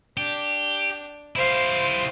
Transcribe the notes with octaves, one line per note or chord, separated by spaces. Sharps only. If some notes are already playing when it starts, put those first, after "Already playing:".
D4 G4
E4 G4 C5 F5